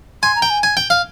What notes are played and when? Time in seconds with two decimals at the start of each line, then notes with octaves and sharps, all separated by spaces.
0.22 G#5 C6
0.36 A#5
0.42 G5
0.50 G#5
0.63 G#5
0.77 G5
0.90 F5